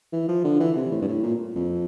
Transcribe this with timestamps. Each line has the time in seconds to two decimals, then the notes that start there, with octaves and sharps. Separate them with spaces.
0.13 E3
0.28 F3
0.44 D3
0.60 E3
0.76 C3
0.91 A2
1.02 G2
1.08 A2
1.23 A#2
1.56 F2